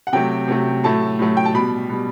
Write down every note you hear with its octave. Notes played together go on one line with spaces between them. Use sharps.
F#5
C3 F#3 A3 G5
C3 F#3 A3
A2 F#3 A3 A5
A2 F#3 A3
G5
A5
B2 G3 B5
B2 G3